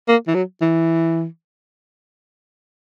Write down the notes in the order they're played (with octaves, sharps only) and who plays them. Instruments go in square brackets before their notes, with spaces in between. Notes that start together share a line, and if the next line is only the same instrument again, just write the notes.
[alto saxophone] A#3
E3
F#3
E3